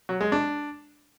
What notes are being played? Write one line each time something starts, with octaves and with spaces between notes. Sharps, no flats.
F#3
G#3
D4